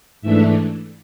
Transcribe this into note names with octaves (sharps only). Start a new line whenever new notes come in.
G#2 E3 A3 D4 E5